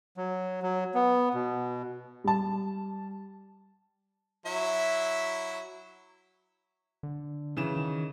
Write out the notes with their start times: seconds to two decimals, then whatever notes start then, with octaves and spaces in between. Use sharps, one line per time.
0.17 F#3
0.62 F#3
0.94 B3
1.34 B2
2.24 G3 A5
4.46 F#3 E4 E5
7.03 D3
7.57 C#3 E3 E7
7.76 D#3